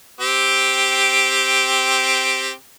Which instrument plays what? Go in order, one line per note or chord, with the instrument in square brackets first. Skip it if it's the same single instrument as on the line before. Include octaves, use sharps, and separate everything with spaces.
[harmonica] C4 G4